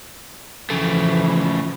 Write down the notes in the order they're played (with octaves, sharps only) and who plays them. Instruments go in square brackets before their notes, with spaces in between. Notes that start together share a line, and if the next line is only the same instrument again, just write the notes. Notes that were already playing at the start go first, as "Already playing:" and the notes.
[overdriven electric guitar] C#3 A3 [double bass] E3 F3